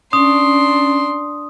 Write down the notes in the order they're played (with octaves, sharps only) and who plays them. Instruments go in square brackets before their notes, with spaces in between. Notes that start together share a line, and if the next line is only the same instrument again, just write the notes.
[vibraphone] C#4 [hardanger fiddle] D4 C6 [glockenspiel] D#6